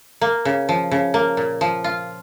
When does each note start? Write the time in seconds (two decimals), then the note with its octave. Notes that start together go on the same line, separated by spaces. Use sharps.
0.21 A#3
0.45 C#3
0.69 F3
0.91 C#3
1.14 A#3
1.37 A#2
1.61 F3
1.84 F4